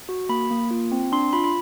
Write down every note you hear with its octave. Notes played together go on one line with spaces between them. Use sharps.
F#4
A#3 B5
A#3
F4
C4
D4 C6
F4 B5
B5